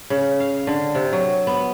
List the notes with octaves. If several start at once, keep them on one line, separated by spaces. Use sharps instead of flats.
C#3
F5
D3
C3
F#3
B3